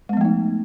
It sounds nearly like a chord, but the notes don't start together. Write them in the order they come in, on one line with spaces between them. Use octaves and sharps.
G#3 B3 F3 A3 D#4